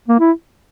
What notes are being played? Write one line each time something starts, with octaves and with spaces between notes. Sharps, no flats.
A#3
E4